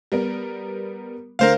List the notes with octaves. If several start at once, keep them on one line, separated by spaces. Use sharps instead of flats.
G3 B3 A#4
D2 D3 A#4 C5 F5